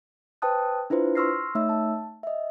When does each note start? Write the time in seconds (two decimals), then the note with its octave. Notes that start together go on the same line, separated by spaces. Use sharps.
0.42 B4 C5 G5 A5 D#6 F#6
0.90 D4 E4 F4 B4 C5
1.15 C6 C#6 E6 F6 A#6 C7
1.55 A3 D#4 C#5 E5 E6
1.69 A5
2.23 D#5 E5